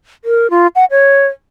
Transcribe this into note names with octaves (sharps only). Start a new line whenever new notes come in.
A#4
F4
F#5
C#5